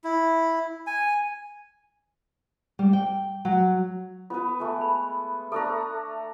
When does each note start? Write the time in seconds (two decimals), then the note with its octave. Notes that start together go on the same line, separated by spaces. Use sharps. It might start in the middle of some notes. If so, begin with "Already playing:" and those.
0.04 E4
0.87 G#5
2.79 G3
2.93 G5
3.45 F#3
4.30 B3 F4 B4
4.60 G#3 A3
4.81 B5
5.52 A3 D4 A4 A#5